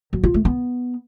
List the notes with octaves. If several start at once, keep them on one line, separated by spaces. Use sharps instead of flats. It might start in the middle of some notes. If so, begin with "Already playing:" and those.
F#3
F4
A3
B3